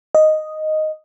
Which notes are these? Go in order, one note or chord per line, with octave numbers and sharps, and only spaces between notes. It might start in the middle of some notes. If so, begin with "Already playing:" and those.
D#5